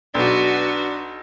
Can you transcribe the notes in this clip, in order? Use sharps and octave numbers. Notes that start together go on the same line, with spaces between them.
B1 D4 F#4 B4